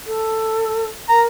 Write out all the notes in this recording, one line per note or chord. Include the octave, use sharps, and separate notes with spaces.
A4
A#4 A#5